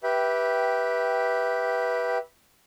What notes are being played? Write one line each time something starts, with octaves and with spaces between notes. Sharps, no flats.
G4 B4 E5 G5